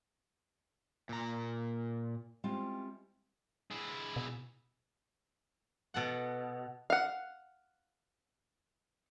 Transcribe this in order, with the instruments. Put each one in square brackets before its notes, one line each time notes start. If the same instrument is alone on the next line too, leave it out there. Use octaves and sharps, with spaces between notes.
[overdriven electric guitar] A#2 A#5
[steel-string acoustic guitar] G3 G#3 C4 C#4 E4 F4
[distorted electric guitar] G#3 E4
[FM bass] B2
[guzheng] B2 A4 F#5
[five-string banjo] F5 F#5